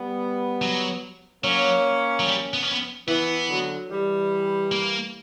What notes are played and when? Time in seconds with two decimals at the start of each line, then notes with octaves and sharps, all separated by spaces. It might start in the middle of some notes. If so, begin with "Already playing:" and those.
Already playing: G3 B3
0.62 F#3
1.44 F#3 A#3 C#4
2.20 F#3
2.26 G3
2.53 B3
2.63 C#4
2.71 B3
3.08 E3 B3
3.49 D3 F#3
3.90 E3 G3
4.72 A#3